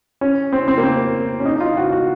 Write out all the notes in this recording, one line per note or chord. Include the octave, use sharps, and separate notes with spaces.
C#4
C4
C4
A#3
C4
C#4
D#4
D#4
F4
F#4
F#4